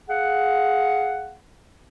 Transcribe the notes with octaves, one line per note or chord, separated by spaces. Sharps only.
G#4 F5 F#5